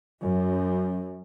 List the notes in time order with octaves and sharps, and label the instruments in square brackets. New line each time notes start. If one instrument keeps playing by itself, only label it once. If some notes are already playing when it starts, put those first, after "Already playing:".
[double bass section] F#2